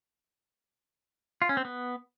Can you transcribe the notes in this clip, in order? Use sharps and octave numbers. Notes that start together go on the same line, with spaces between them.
F4
C#4
C4
B3